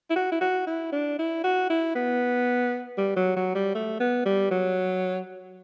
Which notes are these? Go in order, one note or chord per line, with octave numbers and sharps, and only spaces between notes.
E4
F#4
E4
F#4
E4
D4
E4
F#4
E4
B3
G3
F#3
F#3
G3
A3
B3
G3
F#3